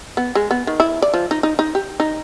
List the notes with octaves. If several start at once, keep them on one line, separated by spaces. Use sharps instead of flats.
B3
G#3
B3
D#3
E4
D5
F3
D#4
D#4
D#4
G4
D#4